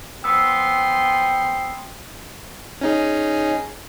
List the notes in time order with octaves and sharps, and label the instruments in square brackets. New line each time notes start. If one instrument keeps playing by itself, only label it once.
[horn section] F3 B3 C6 [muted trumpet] G5 [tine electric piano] E6
[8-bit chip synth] C#4 D#4 G#4